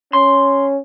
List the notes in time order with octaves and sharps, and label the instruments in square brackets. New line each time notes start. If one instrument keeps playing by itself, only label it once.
[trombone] C#4 [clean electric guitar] C6